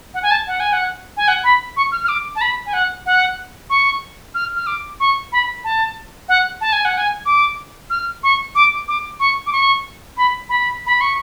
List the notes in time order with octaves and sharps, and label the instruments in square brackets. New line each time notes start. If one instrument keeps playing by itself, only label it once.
[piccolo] F#5
G#5
A5
F#5
G#5
F#5
G#5
F#5
B5
C#6
F6
F6
D6
A5
B5
G#5
F#5
F#5
C#6
F6
F6
D6
C#6
B5
A5
F#5
A5
G#5
F#5
G#5
D6
F6
C#6
D6
D6
C#6
D6
C#6
B5
B5
B5
C#6